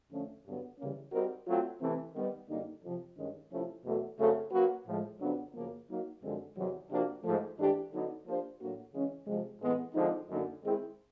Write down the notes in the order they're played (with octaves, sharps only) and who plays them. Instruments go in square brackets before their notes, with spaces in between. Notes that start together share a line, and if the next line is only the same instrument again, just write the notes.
[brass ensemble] F2 D3 F3 A3 C#4
G2 D3 F#3 B3
C#3 E3 G3 A#3 C#4
G3 C4 D#4 F#4 A#4
F#3 A3 C4 F4
C3 E3 A3 C4
D#3 G3 B3
F#2 D3 G3 A#3 D#4
F2 C3 F3
G2 D#3 G#3 C#4
C3 F3 A3 C#4 E4
E2 B2 F#3 A3
F#2 C#3 F#3 A3 C4
F#3 A#3 C#4 F#4 B4
A2 F3 G#3
F2 C#3 F#3 B3 D4
F#2 C#3 F3 A#3
F#3 A#3 D#4
F#2 D3 F3 G#3 C4
E2 C3 D#3 F#3
C3 F3 A#3 D4 F#4
G#2 F3 A3
G#2 E3 A3 D4 G4
D3 F#3 B3 D#4
F3 A#3 D4 G4 C5
A2 F#3 A#3 D4 F#4
C#3 E3 G#3 C#4
C3 F3 G#3
A2 E3 G#3 B3
D3 F3 G#3 C4 D#4
F#2 D3 F#3 A#3 D#4
D#3 G#3 C4 E4 G#4